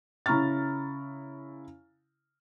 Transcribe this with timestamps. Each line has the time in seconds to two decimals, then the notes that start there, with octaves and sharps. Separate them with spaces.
0.26 C#3 E4 A#5 C#6 F6 A6